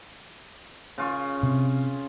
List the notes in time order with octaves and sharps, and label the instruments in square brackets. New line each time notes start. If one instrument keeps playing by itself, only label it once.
[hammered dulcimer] C#3 F4 C#6
[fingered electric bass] C3